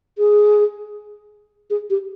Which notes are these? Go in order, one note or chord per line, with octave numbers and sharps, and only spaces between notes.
G#4
G#4
G4